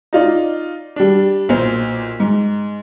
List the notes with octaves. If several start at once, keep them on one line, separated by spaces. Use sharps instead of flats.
D#4 F4 D5
G3 D4
B1 A#2 C5
G#2